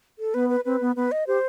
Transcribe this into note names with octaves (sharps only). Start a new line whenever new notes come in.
A4
B3 B4
B4
C4 B4
B3
B3 B4
D#5
G4 C5